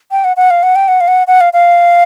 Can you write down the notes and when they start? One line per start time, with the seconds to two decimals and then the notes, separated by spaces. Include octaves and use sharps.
0.11 G5
0.24 F#5
0.37 F#5
0.50 F5
0.63 F#5
0.76 G5
0.88 F#5
1.01 F5
1.08 F#5
1.27 F#5
1.41 F5
1.53 F5